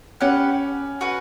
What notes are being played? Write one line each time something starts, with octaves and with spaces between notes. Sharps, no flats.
C#4 G4 B4 F#5
F#4 B4 F#5